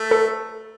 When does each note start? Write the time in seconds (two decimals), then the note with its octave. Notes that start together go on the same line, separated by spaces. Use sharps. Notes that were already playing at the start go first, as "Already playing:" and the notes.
Already playing: A3
0.11 A4